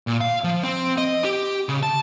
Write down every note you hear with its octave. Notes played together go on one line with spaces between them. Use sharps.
A#2
F5
F3
C4
D#5
G4
C#3
A5